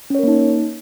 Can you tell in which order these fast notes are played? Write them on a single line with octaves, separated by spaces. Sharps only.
C#4 C#5 A#4 A#3 D#4